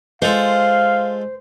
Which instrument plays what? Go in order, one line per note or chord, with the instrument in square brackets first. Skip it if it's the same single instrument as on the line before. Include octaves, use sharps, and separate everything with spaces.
[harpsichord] G#3 F4 A4 [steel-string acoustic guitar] C5 [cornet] F5